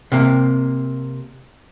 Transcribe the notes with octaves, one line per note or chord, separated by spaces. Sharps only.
C3 A#3